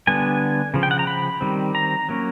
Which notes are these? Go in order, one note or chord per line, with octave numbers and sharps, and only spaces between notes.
D3 G3 B3 D4 G#5
C#3 F3
G5
F#5
A#5
B5
D#3 G3 C4
A#5
F#3 A#3 C#4